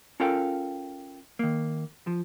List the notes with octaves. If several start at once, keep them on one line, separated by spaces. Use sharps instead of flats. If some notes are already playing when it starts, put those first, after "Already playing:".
C#4 F4 A4 A#4 F5 G5
D#3 A#3
F3